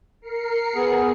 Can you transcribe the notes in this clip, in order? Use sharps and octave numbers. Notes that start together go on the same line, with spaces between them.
A#4 C7 C#7
B3 G#4